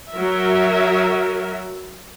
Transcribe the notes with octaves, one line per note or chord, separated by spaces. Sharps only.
F#3 A#4 E5